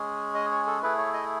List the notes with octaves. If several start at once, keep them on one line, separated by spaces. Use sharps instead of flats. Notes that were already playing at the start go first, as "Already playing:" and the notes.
Already playing: G#3 C#4 G#4
D#5
C#5
A4
A3 E4 G#4 B4
C#5
D#5